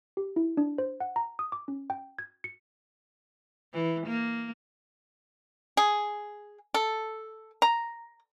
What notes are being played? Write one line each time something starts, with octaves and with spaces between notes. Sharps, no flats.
G4
E4
D4
C5
F#5
A#5
D#6
D6
C#4
G5
G#6
C#7
E3
A#3
G#4
A4
A#5